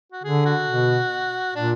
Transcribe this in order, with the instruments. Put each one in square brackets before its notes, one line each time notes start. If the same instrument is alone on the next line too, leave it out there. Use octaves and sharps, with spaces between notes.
[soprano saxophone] F#4
[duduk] D3 [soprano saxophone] G#4
[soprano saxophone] F#4
[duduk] B2
[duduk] A#2 [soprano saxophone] D4